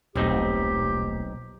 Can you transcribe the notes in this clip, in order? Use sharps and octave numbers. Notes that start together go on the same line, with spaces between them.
D#1 B1 A3 C4 D#4 G4